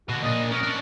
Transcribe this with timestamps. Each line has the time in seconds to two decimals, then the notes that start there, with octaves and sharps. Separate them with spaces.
0.09 B2 D3 F#4
0.23 A#2 D4 D#5
0.51 B3 C#4 A#4
0.63 C#4 D4